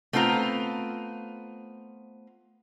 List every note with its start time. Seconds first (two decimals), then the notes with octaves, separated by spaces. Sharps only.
0.13 A3 B3 C4 F4 A#5